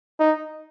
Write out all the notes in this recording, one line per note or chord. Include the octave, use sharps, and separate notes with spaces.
D#4